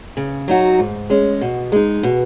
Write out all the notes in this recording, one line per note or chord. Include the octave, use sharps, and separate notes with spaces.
C#3
F#3 D#4 F#4
G#2
G#3 C#4
B2
G#3 D#4
B2